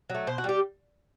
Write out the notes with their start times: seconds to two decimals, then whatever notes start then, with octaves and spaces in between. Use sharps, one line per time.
0.10 F#3
0.15 A3
0.27 B2 C5
0.38 F#4
0.44 G3 G4